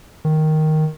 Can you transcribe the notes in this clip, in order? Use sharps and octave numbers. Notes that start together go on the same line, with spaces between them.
D#3